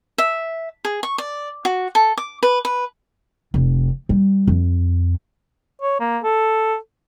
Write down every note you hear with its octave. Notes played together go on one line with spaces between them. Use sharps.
E5
G#4
C#6
D5
F#4
A4
D6
B4
B4
F1
G3
F2
C#5
A#3
A4